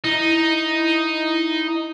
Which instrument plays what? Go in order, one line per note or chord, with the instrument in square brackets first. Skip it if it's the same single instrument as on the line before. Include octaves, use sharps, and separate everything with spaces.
[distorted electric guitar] D#4 [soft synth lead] E4